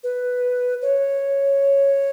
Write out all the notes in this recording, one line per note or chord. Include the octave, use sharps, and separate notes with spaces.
B4
C#5